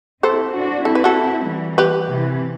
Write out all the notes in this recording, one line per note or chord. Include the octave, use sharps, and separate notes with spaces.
C4 E4 A4 C5
D4 F#4
C4 E4 A4
B4
F#4 A4
E3 G3
G4 B4
C3 E3